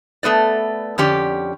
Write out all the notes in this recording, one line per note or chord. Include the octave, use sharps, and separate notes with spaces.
A3 B3 B4 D5
F2 D3 C#4 G4 D5